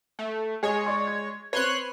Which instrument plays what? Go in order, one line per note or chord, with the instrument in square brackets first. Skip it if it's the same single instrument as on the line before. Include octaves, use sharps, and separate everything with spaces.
[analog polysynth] A3
[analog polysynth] G#3 C#5 [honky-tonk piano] G#4
[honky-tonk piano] D5 C#6
G#6
[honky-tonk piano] C4 B4 [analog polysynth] C#5 C6 F#6